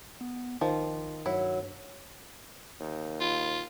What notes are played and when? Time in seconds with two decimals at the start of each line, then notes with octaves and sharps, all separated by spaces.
0.21 B3
0.61 A#1 D#3 F3
1.26 G2 F#3 E4
2.80 D#2
3.21 F4